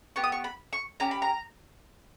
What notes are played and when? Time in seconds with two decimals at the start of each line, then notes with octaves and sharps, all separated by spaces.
0.16 B3 G4 C#6
0.24 D#6
0.32 C#6
0.44 B5
0.73 C#6
1.00 C#4 G4 A#5
1.11 B5
1.22 A#5